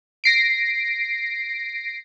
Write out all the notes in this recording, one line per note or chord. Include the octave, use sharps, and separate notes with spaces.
A#6 C7 D7